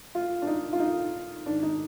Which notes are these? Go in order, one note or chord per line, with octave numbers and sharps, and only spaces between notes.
F4
D4
D#4
F4
D#4
G#2 D#3 D4
D#4